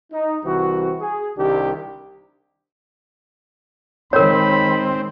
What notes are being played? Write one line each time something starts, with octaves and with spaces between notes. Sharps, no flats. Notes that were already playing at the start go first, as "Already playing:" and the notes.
D#4
C2 E3 C4 F#4
G#4
C2 D#3 G3 D4 G4
D#3 G#3 C4 A#4 C#5 B5